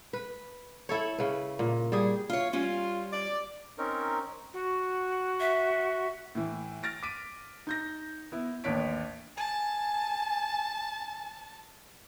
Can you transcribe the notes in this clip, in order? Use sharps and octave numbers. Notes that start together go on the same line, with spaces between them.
B4
E4 A4 C#5
C#3 B4
A#2
G3 G#4
F4 C#5
G3 C#4 F4
D5
C4 C#4 D#4 A#4
F#4
E5
A2 E3
F6 A6 A#6 D7
D6 B6 D7 D#7
D#4 G6 A#6
B3 E4
A1 D#2 D4 C#5 B6 D7
G#5 A5